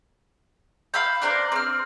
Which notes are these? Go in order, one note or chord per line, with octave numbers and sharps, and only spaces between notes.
F5 B5 E6 G6
D4 A#4 C5 D5
C4 F6